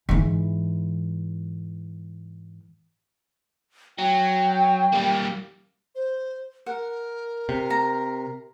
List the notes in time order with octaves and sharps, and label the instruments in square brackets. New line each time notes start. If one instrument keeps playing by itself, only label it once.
[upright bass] G#2 E3
[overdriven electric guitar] F#3 [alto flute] G5
[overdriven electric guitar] G3 A#3
[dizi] C5
[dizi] A#4 [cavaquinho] F#5
[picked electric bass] C3
[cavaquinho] A#5